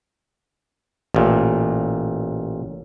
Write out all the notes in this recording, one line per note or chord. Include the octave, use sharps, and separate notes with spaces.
A1 A#2